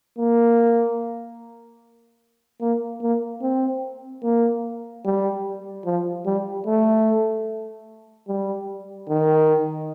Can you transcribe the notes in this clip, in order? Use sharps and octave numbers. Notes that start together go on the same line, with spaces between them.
A#3
A#3
A#3
C4
A#3
G3
F3
G3
A3
G3
D#3